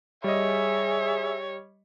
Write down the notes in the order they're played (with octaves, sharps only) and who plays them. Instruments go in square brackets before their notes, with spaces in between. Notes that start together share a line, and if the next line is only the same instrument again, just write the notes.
[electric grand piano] G3 D#5 [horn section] G#4 E5 [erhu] C#5